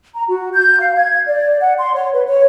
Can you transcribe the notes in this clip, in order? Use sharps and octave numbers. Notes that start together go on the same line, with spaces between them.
A#5
F#4
G6
F5
G#6
D5
F#5
C6
C#5
B4
C#5